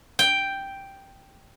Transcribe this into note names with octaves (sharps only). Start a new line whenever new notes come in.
G5